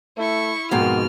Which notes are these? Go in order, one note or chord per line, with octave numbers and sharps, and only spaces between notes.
A3 E4 C#6
F2 G#2 B2 A#3 F#5 F6